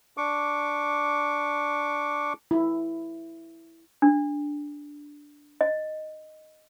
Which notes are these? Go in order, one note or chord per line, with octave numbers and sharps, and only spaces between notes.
D4 C#6 D6
E4
D4
D#5